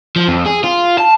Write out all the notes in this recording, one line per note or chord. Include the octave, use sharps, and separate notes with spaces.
F3
F2
G#4
F4
A5